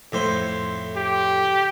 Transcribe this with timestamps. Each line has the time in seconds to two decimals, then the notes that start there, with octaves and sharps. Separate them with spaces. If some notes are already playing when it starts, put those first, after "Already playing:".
0.12 F2 A2 C5
0.97 G4